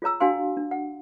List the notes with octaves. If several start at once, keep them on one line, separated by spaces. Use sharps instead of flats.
F4 G#4 C#5 A#5 E6
D4 F#4 F5 G5 G#5 C6
D4
F#5